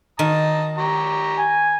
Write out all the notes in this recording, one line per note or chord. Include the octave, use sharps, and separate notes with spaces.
D#3 A5 A#5 D#6
G4 A#5 C#6
G#5